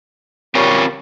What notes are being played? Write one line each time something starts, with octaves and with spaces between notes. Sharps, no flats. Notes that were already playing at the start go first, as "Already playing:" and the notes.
G3 C4 C#4 F4 A#4